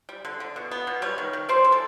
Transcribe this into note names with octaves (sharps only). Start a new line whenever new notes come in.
G3
D3
D3
B2
B3
B2
G3 B4 C#5
D#3
D#3
G3 C5 D5
E3
A4